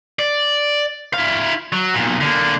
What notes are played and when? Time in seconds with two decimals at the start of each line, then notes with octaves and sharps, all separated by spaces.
0.19 D5
1.14 E4 F5
1.72 F#3
1.94 B1 A#2
2.20 D3 A#3